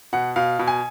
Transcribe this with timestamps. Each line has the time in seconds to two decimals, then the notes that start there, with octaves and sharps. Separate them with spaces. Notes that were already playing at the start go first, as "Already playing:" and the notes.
0.13 B2 F#5
0.36 B2 F5
0.59 B2
0.68 G#5